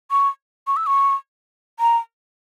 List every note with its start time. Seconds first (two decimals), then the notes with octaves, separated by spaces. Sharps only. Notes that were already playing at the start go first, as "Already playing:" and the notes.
0.11 C#6
0.67 C#6
0.76 E6
0.87 C#6
1.80 A#5